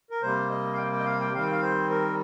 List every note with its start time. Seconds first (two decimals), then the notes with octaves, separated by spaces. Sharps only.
0.10 A#4
0.22 C3 G3 A#3 C5
0.50 D#5
0.74 F5
0.77 G5
0.92 G5
0.99 D#5
1.06 F5
1.20 G5
1.33 D#3 G3 C4 F5
1.43 G5
1.52 F5
1.62 C5
1.90 A#4